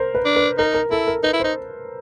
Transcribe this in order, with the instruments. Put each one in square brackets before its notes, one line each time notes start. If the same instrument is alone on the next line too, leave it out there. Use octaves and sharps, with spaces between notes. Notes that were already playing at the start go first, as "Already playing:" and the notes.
Already playing: [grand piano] A#4 C5
B4
[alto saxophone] D4
[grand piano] B4
[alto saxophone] D#4 [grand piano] A#4
[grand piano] A#4
[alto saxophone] E4 [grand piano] A4
[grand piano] A#4
[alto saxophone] D#4 [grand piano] B4
[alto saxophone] E4
[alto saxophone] D#4 [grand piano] C5